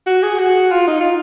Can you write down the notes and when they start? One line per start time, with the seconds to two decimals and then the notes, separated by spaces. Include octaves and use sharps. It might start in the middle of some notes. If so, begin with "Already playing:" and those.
0.06 F#4
0.23 G#4
0.39 F#4
0.71 F4
0.88 D#4
1.00 F4